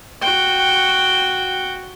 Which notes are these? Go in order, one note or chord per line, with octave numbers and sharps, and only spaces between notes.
F#4 G5